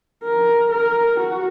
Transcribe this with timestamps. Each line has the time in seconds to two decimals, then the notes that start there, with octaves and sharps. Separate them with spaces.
0.24 A#4
0.71 A#4
1.20 F#4